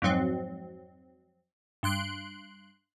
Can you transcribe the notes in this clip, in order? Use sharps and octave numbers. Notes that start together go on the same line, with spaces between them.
F2 G#2 F#3 C4
G2 C6 F#6 D7